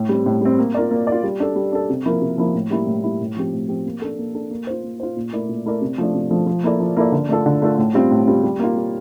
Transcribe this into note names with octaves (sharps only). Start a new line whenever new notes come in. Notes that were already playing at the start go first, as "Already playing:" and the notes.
Already playing: A2
G3 C4
A2
G3 C4
A#3
F4 A#4 D5
A#3
F4 A#4 D5
G3
D4 A4
G3
D4 A4
C3
F3 A#3 E4 A#4
C3
F3 A#3 E4 A#4
A2
G3 A#3 E4
A2
G3 A#3 E4
A2
F3 C4 G4
A2
F3 C4 G4
A#3
D4 A4
A#3
D4 A4
A#3
F4 C5
A#3
F4 C5
A#2
A3 E4 A#4 D5
A#2
A3 E4 A#4 D5
C3
F3 A3 D4
C3
F3 A3 D4
F3
A#3 E4 A4 D5
F3
A#3 E4 A4 D5
D3
A3 D4 F4 A4
D3
A3 D4 F4 A4
A2
G3 C4 F4
A2
G3 C4 F4
G3
A#3 F4
G3